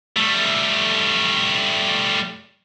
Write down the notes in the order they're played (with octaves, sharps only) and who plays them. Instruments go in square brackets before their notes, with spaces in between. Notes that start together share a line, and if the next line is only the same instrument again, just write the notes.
[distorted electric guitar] G3 A3